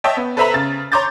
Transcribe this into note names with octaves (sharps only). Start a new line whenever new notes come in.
C#5 D#5 E5 G5 A5
B3
A4 B4 C5 E5 A#5 B5
C#3 A6
C#5 A#5 C6 D6 G6 A6